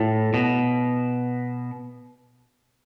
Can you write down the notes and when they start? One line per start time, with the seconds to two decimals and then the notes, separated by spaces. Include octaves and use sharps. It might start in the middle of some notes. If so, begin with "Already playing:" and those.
Already playing: A2
0.34 B2